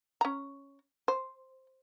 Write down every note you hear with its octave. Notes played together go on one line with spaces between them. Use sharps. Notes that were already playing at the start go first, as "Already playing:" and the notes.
C#4 A#5
C5